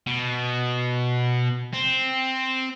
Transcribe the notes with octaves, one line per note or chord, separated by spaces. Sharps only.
B2
C4